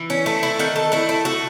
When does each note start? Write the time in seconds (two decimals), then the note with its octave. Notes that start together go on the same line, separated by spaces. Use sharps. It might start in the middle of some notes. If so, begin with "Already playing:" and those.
Already playing: E3
0.10 C#4
0.26 A3 E4
0.43 E4
0.59 D#3 F#4
0.76 A4
0.92 A3 E4
1.09 E4
1.25 A3 F#4